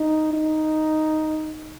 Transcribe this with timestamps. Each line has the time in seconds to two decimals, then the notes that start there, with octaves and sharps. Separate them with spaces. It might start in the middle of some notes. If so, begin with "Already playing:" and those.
Already playing: D#4
0.33 D#4